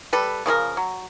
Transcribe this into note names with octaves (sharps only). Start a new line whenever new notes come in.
G3 A4 B4
C#3 F3 C#4 A#4
F#3